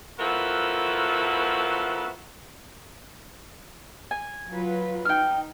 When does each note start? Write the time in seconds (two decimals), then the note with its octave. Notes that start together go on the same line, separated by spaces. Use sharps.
0.19 F3 B3 E4 F#4 A4 A#4
4.11 G#5
4.49 F#3 F4 B4
5.05 D#4 G5 F6